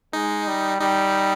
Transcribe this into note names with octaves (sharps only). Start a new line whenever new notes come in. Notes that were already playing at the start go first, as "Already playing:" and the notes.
G#3 D#4
G3
G3 D#4